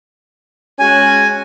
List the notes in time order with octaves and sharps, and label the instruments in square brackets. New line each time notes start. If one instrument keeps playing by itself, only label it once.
[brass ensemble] G#3 C#4 F#4 [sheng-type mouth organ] G#5